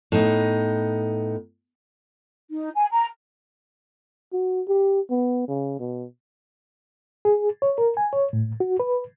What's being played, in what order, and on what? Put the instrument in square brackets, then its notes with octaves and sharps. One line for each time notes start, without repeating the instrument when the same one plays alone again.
[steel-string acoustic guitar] A2 B3 D#4
[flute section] D#4
G#5
A#5
[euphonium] F#4
G4
B3
C#3
B2
[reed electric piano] G#4
C#5
A#4
G#5
C#5
A2
F#4
B4